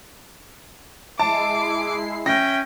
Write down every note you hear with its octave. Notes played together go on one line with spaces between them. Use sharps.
G#3 E4 A5 D6 C7
C#4 E5 G5 A#6